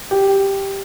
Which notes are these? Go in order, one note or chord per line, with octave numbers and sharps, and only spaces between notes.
G4